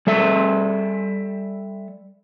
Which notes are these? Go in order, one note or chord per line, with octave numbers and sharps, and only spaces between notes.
G3 A4 E5